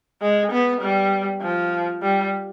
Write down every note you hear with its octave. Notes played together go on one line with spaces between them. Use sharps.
G#3
B3
G3
F3
G3